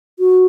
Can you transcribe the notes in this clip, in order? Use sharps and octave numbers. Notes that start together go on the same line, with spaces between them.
F#4